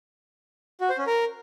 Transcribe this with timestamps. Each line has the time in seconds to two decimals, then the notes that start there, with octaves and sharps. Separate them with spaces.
0.81 F#4
0.89 C5
0.98 C#4
1.07 A#4